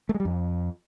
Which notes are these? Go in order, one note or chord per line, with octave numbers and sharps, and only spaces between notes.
A3
G#3
G3
F2